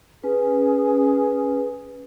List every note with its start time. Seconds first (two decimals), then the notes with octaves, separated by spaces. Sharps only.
0.24 C#4 G#4 B4